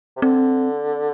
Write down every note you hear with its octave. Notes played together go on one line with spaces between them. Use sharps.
C3
D3 C4